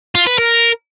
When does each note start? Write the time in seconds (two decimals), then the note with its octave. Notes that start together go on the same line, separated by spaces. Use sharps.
0.15 F4
0.27 B4
0.38 A#4